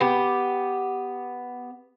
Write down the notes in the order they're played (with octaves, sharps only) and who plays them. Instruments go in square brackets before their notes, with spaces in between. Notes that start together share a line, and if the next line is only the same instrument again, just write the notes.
[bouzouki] B3 G4